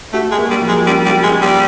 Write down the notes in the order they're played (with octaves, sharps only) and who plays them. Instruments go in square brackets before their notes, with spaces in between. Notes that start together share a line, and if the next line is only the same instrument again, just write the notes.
[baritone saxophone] A3 [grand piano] F#4
[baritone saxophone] G#3
[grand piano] A#3
[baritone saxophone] G3
[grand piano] F3
[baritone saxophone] G#3
[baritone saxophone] G3 [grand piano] C#4
[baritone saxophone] G3
[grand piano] F#4
[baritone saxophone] G#3
[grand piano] A#3
[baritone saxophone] G3